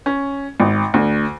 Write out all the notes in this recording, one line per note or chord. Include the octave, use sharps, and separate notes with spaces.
C#4
G#1
D2